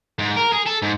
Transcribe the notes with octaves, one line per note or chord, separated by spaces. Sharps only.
G#2
A#4
G#4
A4
G#2